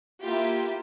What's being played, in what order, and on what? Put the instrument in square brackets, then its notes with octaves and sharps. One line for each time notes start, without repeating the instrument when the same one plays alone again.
[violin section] A#3 E4 F4 G4